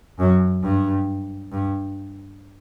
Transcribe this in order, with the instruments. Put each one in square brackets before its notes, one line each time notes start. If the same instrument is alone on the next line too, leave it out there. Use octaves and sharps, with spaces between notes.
[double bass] F#2
G2
G2